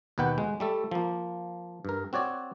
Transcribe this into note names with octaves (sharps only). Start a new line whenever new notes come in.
D#2 B2 B4 F#5 G5
G#3
G3 A3 A4
F3 A#3
G2 A#4
C4 F#4 C#5 D5